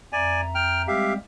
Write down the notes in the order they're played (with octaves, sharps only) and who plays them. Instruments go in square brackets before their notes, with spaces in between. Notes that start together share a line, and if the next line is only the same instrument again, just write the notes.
[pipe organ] F2 E5 A#5 [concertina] D5 G#5
[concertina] G5 F6
[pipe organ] G3 G#3 C4 [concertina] G4 E5 F5